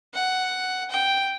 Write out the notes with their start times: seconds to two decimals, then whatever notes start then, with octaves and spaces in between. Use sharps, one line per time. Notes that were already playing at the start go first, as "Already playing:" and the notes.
0.14 F#5
0.91 G5